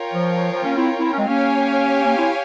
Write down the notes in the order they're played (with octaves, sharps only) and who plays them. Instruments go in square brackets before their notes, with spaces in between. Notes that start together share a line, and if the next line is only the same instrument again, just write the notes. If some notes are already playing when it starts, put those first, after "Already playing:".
Already playing: [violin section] F4 A#4 C#5 G5
[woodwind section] F3
F3
A#3 C#4
C4 E4
C4 E4
C#4
G#3 C4
[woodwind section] A#3 C#4 [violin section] G4 C#5 F5 G#5
[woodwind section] A#3 C#4
C4 E4